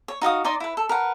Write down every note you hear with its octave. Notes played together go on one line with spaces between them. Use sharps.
C#5
D#4 F#4 F5 D#6
D#4 D5 D#5 C6
E4 B4
A4
A#4 B4 F#5